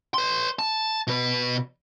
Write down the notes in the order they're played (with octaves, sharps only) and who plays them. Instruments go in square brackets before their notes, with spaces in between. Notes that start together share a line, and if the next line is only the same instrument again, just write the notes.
[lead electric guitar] B4 C6
A5
B2 B4